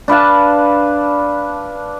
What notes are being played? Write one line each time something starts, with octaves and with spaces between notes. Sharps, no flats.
D4 B4 F5 A5